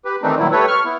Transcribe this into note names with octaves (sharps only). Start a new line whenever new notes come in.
G4 B4
D#3 E3 A3 C4 D4 D#4
A#2 D#3 F#3 G3 E4
G3 A3 A4 B4 C#5
C#6 F6
B3 E4